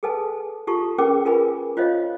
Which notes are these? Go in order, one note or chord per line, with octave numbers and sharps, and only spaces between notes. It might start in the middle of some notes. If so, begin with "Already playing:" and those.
G#4 A4 B4 G#5 A5
F4 G4 A4 A5 A#5 C#6
C#4 G#4 A#4 B4 G5 D6
F4 G#4 A#4 B4 G#5 B5
F4 C5 C#5 D#5 F5